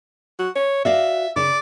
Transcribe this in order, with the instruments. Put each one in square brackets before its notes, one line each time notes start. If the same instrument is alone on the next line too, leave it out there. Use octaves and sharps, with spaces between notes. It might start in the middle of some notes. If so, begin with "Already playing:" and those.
[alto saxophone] F#4
C#5
[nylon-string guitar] F#4 D5 F5 [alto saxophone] E5
[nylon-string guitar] C#3 [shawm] D5